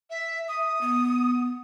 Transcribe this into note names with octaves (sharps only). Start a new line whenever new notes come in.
E5
E5 D#6
B3